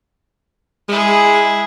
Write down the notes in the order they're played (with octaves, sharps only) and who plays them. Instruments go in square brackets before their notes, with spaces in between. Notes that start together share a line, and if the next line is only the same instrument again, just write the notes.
[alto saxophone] G#3 [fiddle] E4 G#4